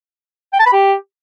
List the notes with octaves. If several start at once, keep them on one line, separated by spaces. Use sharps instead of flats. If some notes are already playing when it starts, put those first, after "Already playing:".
G5
A5
B5
G4